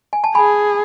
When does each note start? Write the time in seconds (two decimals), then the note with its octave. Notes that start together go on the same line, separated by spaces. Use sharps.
0.13 G#5
0.24 A5
0.35 G#4 G#5 B5